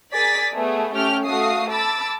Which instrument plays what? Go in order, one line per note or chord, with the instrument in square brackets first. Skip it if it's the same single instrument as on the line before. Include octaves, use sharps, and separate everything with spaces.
[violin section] G#4 A#4 D5 G#5 A6 B6
A3 B3 G#4 B4
A3 C#4 G4 G5 F6
A3 F#4 F5 D#6 C7
A5 B5 D6 E6 A6